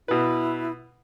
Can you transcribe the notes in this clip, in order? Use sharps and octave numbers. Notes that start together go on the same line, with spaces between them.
B2 E4 B4